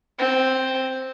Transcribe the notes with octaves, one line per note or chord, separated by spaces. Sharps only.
C4